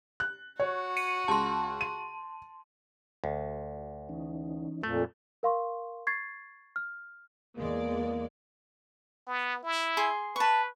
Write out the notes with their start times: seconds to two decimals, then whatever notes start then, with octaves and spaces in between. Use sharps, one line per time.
0.20 F#6
0.60 F#4 C#5
0.97 C#7 D#7
1.28 C#2 A5 C6
1.81 D#7
3.24 D2
4.09 E3 C#4 D#4
4.83 F2 A#2 A3
5.43 A#4 F5 C6 C#6
6.07 C#6 G#6 A6 C7
6.76 F6
7.57 E2 G#3 A#3 D5
9.28 B3
9.63 E4
9.97 G#4 C6
10.36 B4 A5 C#6